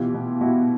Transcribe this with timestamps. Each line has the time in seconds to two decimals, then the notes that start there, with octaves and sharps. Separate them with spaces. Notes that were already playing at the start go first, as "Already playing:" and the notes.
Already playing: B2 E3 F4 G4
0.14 B2
0.41 B2 E4 F#4